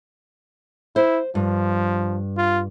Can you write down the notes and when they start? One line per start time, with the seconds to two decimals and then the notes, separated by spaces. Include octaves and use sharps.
0.96 E4 C5
1.35 G2 F3
2.37 F4